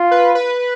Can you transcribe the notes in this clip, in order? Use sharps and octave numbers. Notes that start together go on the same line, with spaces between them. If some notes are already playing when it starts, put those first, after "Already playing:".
Already playing: F4
B4
B4